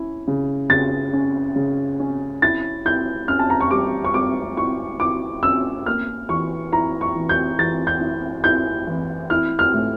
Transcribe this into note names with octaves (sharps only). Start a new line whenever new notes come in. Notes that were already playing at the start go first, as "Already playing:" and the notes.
Already playing: C#4 E4
C#3
C#3 A6
C#4
C#3
C#4
E4 A6
E4 G6
C#4 F6
A5
A#5
C#6
G3 D6
C#6
G3 D6
E4 C#6
E4 D6
C#4 E6
A#3 F6
E3 C#6
E4 A#5
C#6
E3
G6
E3 A6
G6
E4
E4 G6
E3
E4 F6
F6
A2